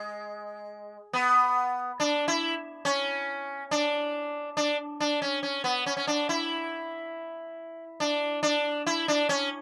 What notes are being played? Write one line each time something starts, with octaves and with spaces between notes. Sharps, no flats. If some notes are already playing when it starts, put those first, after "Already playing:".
Already playing: G#3
B3
D4
E4
C#4
D4
D4
D4
C#4
C#4
B3
C#4
C#4
D4
E4
D4
D4
E4
D4
C#4